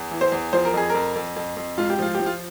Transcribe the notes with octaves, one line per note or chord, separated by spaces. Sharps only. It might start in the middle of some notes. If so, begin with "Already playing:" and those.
Already playing: E2
E3
C5
E2
F3 C5
A#4
F2 G#4
F2 A#4
F2
F2
F2
G#2 F4
G4
F3 F4
G4
F3
F4